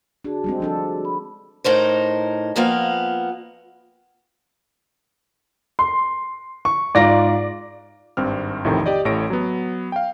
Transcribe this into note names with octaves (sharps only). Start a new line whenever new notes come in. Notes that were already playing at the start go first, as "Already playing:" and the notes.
D4 F#4 G#4
G3 G#3 C4
F3 D4 A4
B5
A2 D#4 A#4 C5
F2 F3 A#3 B3 F5
C6
C#6
G#2 F4 D5 A#6
G#1 G2 C4 F6
A1 F2 A2 C3 D#3
G4 D5 D#5
A1 A2 C#5 A#6 D7
F#3 B3
F5 G5